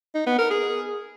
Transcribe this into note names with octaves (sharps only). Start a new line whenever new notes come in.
D#4
B3
A#4
G#4